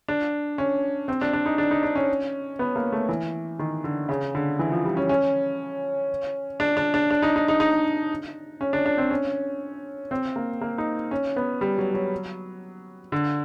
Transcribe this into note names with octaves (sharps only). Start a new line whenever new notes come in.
D4
C#4
C4
D4
D4
D#4
D4
D#4
D4
C#4
B3
A#3
A3
E3
D#3
D3
C#3
D3
E3
F3
G3
C#4
C#4
D4
D4
D4
D4
D#4
D#4
D#4
D#4
C#4
D4
D4
C4
C#4
C4
A#3
A#3
D#4
C#4
B3
G3
F#3
F#3
D3